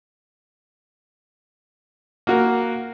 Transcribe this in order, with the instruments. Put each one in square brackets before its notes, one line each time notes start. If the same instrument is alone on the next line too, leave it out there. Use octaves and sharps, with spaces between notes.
[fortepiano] A#3 F#4 A#4